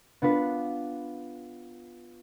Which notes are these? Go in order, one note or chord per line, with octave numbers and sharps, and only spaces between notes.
B3 D4 F4 B4